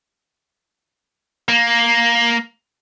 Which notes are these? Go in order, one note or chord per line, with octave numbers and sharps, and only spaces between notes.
A#3